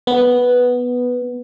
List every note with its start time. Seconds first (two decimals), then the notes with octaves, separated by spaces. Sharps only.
0.07 B3